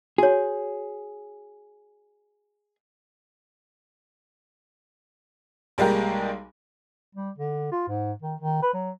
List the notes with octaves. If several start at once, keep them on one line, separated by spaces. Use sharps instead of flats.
F#4 G#4 C#5
B1 G3 G#3 A#3 G4 A#5
G3
D3
F4
G#2
D#3
D#3
B4
F#3